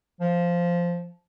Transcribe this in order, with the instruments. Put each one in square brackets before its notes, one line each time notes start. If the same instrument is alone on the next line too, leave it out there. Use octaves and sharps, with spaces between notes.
[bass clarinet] F3